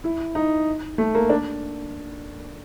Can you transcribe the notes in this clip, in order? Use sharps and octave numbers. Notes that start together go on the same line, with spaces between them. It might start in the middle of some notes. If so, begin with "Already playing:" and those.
E4
D#4
A3
A#3
D4